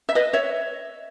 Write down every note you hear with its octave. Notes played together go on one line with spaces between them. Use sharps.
E5
B4 D#5
C#5 E5